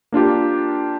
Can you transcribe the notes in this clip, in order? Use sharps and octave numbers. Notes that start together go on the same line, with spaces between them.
A#3 D4 F4 G4